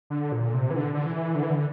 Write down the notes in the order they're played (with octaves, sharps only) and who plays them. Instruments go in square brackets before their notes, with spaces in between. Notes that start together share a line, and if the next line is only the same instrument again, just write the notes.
[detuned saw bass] D3
A#2
C3
E3
D3
D3
E3
D3
E3
D3